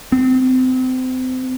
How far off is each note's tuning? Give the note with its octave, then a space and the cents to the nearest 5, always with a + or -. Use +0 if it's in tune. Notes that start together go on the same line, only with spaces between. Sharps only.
C4 -30